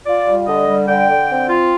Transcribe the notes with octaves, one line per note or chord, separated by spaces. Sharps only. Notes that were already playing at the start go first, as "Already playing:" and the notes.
F4 D5
G3
D3 D#5
G3
D3 G5
D3
C4
F4